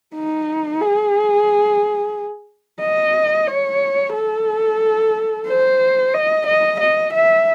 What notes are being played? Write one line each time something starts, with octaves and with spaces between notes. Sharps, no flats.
D#4
G#4
D#5
C#5
A4
C5
D#5
D#5
D#5
E5